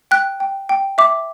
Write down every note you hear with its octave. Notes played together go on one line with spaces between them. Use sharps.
G5 F#6
G5
G5
E5 D6